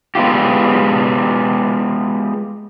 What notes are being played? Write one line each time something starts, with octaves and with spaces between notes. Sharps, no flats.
G#3 B3 C#4 F4 G4